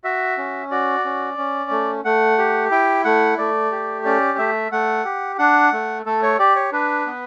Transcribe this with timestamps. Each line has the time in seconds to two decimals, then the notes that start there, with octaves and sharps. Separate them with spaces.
0.04 F#4 E5
0.37 C#4
0.71 F#4 D5
1.05 C#4
1.38 C#4
1.71 A3
2.05 A3 F#5
2.38 G4
2.71 E4 G5
3.05 A3 F#5
3.38 A3 D5
3.72 G4
4.05 C#4 D5
4.38 A3 E5
4.72 A3 F#5
5.05 G4
5.38 D4 F#5
5.73 A3
6.06 A3 A4
6.23 C#5
6.39 G4 D5
6.56 C#5
6.72 D4 B4
7.06 B3